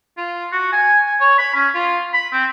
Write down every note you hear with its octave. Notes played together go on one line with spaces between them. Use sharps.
F4
F#4
G#5
G#5
C#5
B5
C#4
F4
B5
C4